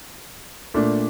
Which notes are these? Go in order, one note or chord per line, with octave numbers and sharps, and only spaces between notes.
A#2 A3 D4